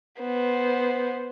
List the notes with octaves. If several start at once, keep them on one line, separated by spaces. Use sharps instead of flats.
B3 C5